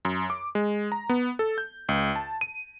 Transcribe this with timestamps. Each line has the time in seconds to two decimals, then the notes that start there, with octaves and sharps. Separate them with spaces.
0.05 F#2
0.30 D6
0.55 G#3
0.92 A#5
1.09 B3
1.39 A4
1.58 G6
1.89 C#2
2.16 A5
2.41 D#7